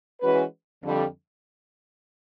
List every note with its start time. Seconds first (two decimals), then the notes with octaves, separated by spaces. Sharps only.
0.21 E3 G#3 C#4 F#4 B4
0.83 F2 D3 G3